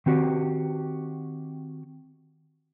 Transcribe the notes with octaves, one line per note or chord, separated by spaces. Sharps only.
D#3 C4 F#4 G4